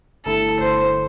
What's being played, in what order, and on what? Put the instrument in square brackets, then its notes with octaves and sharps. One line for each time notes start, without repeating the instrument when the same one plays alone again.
[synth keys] G1 G2 D3 A3 E4 [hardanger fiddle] A4
[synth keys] G1 G2 D3 A3 E4 [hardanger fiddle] C5